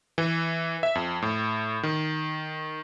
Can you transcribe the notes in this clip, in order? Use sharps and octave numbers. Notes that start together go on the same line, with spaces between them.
E3
E5
F2
A2
D#3